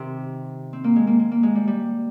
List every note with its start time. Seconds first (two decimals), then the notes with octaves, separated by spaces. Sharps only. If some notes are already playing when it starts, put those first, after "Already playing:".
Already playing: C3 D#3
0.73 C4
0.84 A#3
0.96 G#3
1.07 A#3
1.19 A#3
1.31 A#3
1.43 G#3
1.55 G3
1.67 G3